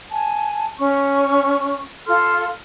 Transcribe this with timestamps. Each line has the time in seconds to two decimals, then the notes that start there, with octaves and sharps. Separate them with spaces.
0.11 G#5 A5
0.79 C#4 C#6
2.07 F4 A4 C6 F6